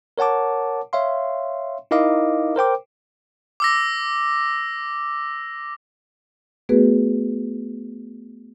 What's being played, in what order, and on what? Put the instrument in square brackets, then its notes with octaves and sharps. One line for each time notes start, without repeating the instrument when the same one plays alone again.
[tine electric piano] A#4 C#5 F#5 A5 D6
C#5 E5 F5 C6
D#4 E4 A#4 D#5 F5 D6
A#4 C5 G5 D6
[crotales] D6 E6 A#6
[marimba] A3 B3 F#4 G#4 B4